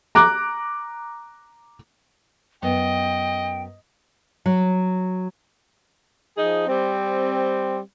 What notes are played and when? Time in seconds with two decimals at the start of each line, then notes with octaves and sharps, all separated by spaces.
0.15 A#5 D6 F#6
2.63 F#2 B3 D#5 G5
4.46 F#3
6.38 F3 D#4 G#4
6.67 G3 C4